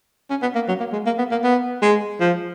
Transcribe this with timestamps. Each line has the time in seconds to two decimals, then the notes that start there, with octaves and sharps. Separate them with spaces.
0.30 C#4
0.42 B3
0.55 A#3
0.68 F#3
0.80 A#3
0.93 G#3
1.06 A#3
1.18 B3
1.31 A#3
1.44 B3
1.82 G#3
2.20 F3